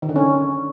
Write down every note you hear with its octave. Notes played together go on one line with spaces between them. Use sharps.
D#3
D3
C#4